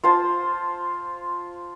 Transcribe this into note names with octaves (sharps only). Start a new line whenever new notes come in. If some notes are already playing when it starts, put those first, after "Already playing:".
F4 C5 A5